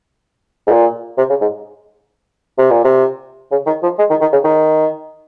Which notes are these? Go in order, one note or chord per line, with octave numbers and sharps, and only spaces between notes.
G#2
A#2
C3
C#3
G#2
C3
A#2
C3
C#3
D#3
F3
G#3
D#3
D#3
C#3
D#3